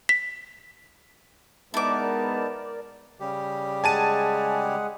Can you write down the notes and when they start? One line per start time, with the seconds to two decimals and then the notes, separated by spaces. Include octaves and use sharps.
0.09 B6
1.74 G#3 B3 D#4 E4 A#4 D5 A5 D6
3.20 C#3 G3 G4
3.84 G#3 G#4 F#5 G#5 A5 D#7